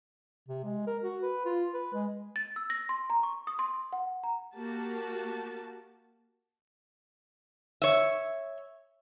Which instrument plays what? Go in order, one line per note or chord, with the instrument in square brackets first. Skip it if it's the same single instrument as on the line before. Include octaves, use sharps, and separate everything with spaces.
[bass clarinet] C3
G#3
A#4
F#4
B4
F4
B4
G#3
[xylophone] A6
E6
A#6
C6
A#5
C#6
D#6
C6
F#5
A#5
[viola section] A#3 F#4 G4 A5
[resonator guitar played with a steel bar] C#5 E5